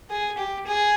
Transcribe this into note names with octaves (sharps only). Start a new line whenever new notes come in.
G#4
G4
G#4